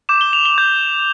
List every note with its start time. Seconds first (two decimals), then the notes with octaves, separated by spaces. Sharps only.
0.09 D6 G6 E7
0.21 G7
0.33 F7
0.45 G7
0.58 D6 G6